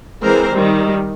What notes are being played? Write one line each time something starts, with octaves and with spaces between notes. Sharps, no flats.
E3 G#3 C4 A#4 C5
D#3 G3